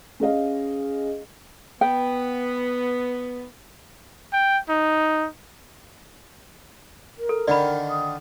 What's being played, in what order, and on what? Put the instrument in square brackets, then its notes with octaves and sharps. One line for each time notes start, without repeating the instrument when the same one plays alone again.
[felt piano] C#4 G#4 D#5 F5
[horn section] B3 [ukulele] G5
[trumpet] G5
D#4
[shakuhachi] A#4
[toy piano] A4
[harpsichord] D3 D#3 [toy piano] D5 B5
[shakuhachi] D#6